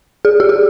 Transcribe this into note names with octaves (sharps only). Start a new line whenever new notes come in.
G#4
G4
G#4